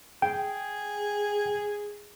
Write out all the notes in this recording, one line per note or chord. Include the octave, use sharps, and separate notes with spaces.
G#4 G5